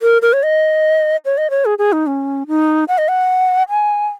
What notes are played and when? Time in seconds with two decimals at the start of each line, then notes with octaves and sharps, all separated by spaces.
0.02 A#4
0.22 A#4
0.33 C#5
0.43 D#5
1.25 C#5
1.38 D#5
1.50 C#5
1.65 G#4
1.79 G#4
1.93 D#4
2.07 C#4
2.48 D#4
2.88 F#5
2.98 D#5
3.08 F#5
3.70 G#5